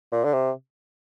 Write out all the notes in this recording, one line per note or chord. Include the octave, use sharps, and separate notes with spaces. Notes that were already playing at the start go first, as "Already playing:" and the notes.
A#2
D3
C3